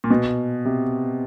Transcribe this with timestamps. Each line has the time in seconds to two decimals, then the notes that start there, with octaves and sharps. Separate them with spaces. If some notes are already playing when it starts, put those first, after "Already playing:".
0.04 A#2
0.10 B2
0.65 C3